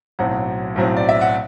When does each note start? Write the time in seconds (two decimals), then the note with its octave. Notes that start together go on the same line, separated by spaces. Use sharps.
0.19 B1 A2 F#3 C4 F#5
0.76 B1 A2 F#3 C4
0.97 D5
1.09 E5
1.21 F#5